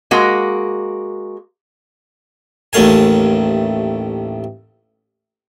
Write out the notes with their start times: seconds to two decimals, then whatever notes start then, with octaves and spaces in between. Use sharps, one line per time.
0.11 G#3 A#3 F#4
2.73 A1 D#2 A3 F5 G#5